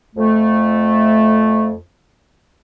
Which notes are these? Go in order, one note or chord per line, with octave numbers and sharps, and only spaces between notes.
F2 A3